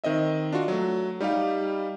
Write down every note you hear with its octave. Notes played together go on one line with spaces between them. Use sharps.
D#3 C4 D#5 E5
D4 F4 F#4
F#3 A3
G3 D#4 G4 F5